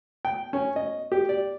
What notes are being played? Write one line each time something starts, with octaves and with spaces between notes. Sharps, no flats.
G5
C#4
D#5
G4
D5